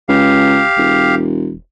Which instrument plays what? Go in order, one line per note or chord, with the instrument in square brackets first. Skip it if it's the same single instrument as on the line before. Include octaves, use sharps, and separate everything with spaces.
[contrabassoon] C#2 [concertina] G4 F5
[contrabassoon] E1